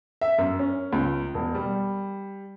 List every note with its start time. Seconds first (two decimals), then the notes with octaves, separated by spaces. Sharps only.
0.21 E5
0.38 F#2
0.59 C#4
0.93 C#2
1.34 E1
1.55 G3